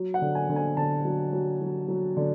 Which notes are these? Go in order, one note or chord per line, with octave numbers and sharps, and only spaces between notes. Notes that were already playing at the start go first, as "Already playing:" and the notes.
Already playing: F#3
F#5
D3
G#5
D3
G#5
D3 A5
F#3
F#3
F#3
F#3
D3